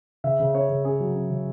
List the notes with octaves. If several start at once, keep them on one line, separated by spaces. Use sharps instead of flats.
C#3 E5
C#3
C#4 C#5
C#3
C#4 G#4
F#3
C#4
C#3